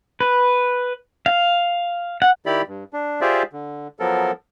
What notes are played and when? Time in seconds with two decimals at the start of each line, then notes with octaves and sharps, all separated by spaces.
0.20 B4
1.26 F5
2.22 F#5
2.46 D#3 E4 G4 D5 B5
2.68 G2
2.93 D4
3.21 F4 G4 G#4 C5 D5 E5
3.53 D3
4.00 F3 F#3 B3 A4 A#4